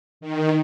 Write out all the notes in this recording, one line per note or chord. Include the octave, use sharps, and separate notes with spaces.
D#3